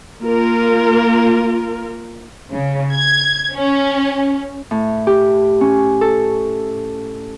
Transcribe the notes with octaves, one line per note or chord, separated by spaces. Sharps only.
A#3 F4 A#4
C#3
G#6
C#4
A2
G4
C#4
A4